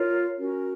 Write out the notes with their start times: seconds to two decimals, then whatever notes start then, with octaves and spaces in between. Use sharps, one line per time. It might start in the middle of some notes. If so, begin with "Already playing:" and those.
Already playing: F4 A#4 C#5
0.37 C#4 F#4 A#4